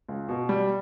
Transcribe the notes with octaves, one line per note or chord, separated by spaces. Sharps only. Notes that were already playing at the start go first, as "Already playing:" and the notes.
C#2
B2
G3